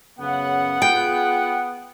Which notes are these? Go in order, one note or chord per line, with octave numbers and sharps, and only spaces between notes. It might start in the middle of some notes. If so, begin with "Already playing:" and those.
F#2 C#3 B3 F#5
F4 G#4 G5